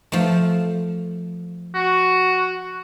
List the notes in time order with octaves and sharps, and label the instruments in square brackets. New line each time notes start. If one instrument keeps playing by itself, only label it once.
[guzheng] F3 A3
[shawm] F#4